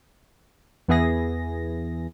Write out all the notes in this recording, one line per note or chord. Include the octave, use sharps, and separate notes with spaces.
E2 E3 B3 E4 G#4 A#6